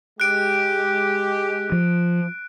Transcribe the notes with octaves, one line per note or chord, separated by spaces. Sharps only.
G#3 G4 F#6 D7
F3